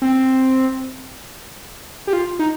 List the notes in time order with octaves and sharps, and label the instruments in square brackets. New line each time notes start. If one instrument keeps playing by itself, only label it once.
[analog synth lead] C4
G4
F4
D#4